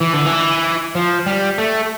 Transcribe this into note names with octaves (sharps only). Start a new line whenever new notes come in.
E3
D3
E3
F3
G3
A3